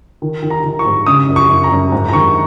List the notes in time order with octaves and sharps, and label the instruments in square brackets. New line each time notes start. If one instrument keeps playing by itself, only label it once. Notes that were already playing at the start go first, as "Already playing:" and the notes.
[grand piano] D#3
D#3
A#5
D#3
C#6
G#2
C#3 D#6
F#2
C#6
F#2
A#5
F#2
G#2
A#5
D#3 C#6